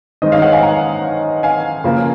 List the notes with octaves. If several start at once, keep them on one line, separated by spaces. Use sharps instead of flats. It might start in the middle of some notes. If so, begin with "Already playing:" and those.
D#3 G#3 C5 D#5
C#5 F5
D#5 F#5
F5 G#5
F#5 A#5
F5 G#5
C#3 F3 A#3